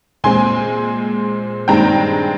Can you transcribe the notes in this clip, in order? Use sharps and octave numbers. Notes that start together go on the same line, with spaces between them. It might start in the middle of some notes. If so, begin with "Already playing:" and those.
A#2 G#3 C4 G#5 C6
G2 D#3 G#3 C4 G5 A#5